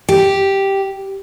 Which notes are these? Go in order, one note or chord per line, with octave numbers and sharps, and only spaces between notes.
G4